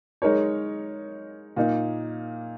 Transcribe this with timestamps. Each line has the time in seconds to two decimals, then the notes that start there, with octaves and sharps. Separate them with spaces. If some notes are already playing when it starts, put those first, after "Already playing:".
0.22 G#3 D#4 A#4 C#5
1.56 A#2 A#3 D#4